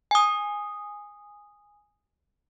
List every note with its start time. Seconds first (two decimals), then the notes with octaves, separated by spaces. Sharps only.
0.11 G#5 D#6